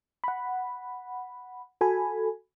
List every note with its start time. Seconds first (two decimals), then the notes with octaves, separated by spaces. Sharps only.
0.24 F#5 B5
1.81 F#4 A4 G#5 B5